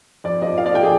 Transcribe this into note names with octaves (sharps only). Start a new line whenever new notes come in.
F2 D5
F3 D#5
F3 F5
D5
F3 G5
G#4